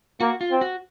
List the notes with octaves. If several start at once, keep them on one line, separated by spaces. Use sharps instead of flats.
A#3 F#4
F4
C4
F#4